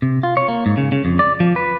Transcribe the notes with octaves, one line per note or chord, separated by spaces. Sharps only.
C3
F4
C#5
A#3
G#2
C#3
C#3
F2
D5
F3
B4